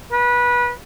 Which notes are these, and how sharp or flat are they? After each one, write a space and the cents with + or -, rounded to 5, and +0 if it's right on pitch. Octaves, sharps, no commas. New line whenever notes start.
B4 -25